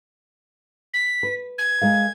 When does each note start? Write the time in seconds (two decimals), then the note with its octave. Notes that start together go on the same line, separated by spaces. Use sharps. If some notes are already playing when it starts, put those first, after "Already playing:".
0.93 B6
1.23 B4
1.58 G#6
1.81 G#3 A#4 F5